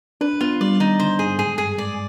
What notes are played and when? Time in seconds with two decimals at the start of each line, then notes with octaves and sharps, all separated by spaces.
0.21 D4 B4
0.41 B3 F4
0.61 G3 D5
0.80 D#3 D#4
1.00 D3 C5
1.19 G2 G#4
1.38 G#2 G#4
1.58 G2 G#4
1.78 G#2 D5